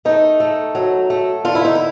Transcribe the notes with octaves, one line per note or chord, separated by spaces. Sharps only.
A3 D#4
A3
F#3
A3
D3 F4
E4
D#4
E4